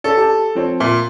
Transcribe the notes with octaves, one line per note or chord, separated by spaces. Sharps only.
C#4 A4 D5
G4 A5
F3 C4 C#5
A#2 E5